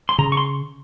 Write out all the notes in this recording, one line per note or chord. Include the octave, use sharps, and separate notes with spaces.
C6
C#3 A#5
C#6
C6